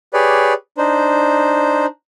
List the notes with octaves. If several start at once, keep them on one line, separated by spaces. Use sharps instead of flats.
G4 G#4 B4 C#5 D5
D4 D#4 C5